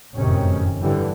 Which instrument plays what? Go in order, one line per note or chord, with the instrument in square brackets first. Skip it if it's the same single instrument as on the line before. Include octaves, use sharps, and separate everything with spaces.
[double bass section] F1 F#2 A2 C3 D#3 C#4
G2 D3 E3 G3